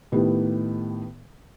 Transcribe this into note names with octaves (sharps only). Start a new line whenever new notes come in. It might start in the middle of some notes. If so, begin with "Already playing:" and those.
A2 D#3 B3 G4